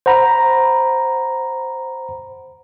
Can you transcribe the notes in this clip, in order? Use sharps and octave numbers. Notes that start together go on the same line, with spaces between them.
C5 F#5 A#5 B5